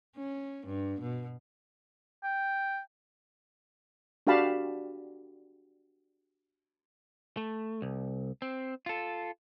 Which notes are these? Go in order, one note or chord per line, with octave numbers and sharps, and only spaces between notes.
C#4
G2
B2
G5
D4 F#4 G4 F5 A5 B5
A3
C2
C4
F4 A4